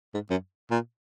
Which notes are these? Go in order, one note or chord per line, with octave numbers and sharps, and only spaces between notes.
G#2
F#2
A#2